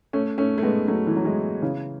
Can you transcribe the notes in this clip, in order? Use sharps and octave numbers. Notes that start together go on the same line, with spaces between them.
A3 C#4
A3 C#4
A3
G#3 B3
F#3 A3
E3
F#3
E3 G#3
C#3 E3